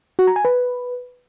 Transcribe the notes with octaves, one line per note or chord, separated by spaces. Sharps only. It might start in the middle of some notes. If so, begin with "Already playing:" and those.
F#4
A#5
G#5
B4